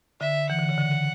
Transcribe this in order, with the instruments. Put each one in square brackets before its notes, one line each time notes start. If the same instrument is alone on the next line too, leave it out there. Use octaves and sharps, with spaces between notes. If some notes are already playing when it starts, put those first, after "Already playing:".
[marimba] D3 [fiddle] E5
[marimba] E3 [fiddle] F#5
[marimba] D3
C#3
D3